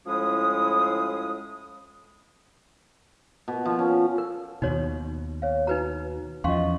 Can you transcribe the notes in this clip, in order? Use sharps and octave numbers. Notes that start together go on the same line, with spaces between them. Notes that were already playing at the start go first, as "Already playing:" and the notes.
A2 F3 G#3 C#4 E4 D#6
B2
F3
C#4
A#4
D#2 B2 D#4 F#4 C#5
C#5 F5
D#4 F#4 B4 A#5
E2 F3 C#4 D#5 F5 C6 C#6